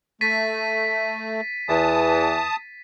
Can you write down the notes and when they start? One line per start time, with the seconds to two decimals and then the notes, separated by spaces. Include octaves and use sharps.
0.21 A3 A6 B6 D#7
1.69 E2 E3 A5 D#6